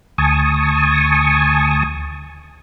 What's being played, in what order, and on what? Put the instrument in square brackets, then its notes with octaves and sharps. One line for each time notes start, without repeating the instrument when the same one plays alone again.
[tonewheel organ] D2 G#5 A5 C#6 D#6